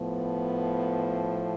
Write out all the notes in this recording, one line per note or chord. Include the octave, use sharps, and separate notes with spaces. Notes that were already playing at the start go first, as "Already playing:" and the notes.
Already playing: A2 F3 B3